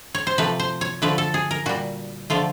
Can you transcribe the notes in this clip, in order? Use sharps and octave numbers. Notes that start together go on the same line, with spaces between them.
C#5
C5
C3 F3 A3 B4
C5
C#5
D3 F3 A3 B4
A4
G#4
A#4
A#2 G3 F#4
D3 F3 A3 F4